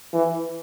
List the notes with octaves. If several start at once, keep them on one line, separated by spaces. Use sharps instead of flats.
E3